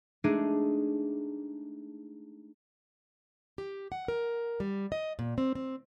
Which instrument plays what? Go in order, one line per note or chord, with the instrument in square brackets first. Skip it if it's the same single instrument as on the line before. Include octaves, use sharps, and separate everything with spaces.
[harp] G#3 A3 D4 D#4 G#4
[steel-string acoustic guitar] G4
F#5
A#4
G3
D#5
A#2
C4
C4